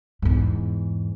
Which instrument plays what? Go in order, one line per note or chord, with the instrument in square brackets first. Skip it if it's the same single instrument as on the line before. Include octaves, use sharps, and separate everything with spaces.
[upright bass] E2 G#2